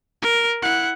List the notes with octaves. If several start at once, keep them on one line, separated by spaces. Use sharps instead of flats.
A#4
E4 F#5